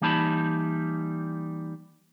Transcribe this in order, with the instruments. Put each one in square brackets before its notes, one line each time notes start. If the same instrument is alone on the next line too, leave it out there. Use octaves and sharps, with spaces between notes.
[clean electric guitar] E3 G3 A#3 D#4 A5 B5